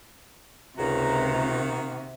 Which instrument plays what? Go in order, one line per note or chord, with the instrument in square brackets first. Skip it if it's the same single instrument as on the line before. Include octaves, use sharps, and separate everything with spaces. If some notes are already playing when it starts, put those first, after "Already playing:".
[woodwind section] C#2 A#5 [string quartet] C3 [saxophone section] D#3 A#3 F#4